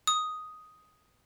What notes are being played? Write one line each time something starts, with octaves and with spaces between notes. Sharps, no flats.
D#6